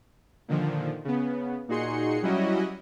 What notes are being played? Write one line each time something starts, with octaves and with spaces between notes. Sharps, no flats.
A#2 D3 D#3 F3
C#3 B3
A#2 D#4 F#4 G#4 C6 C#7
F#3 G3 C#4 E4 F#4 D#5